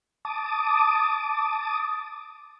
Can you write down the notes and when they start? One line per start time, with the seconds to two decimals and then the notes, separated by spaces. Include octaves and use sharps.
0.25 A5 D6 D#6